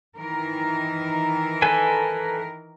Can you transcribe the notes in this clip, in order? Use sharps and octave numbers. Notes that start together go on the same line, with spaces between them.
D#3 E3 A#4
A4 B4 G#5